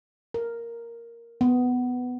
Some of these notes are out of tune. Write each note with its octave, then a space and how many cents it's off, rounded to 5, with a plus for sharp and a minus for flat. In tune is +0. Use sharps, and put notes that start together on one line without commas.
A#4 +0
B3 +10